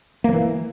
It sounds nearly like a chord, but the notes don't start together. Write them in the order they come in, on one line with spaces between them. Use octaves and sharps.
A#3 F3 E3